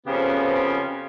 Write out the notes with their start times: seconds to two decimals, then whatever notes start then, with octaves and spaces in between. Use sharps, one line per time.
0.07 F2 C#3 B3 C#4 G4 C5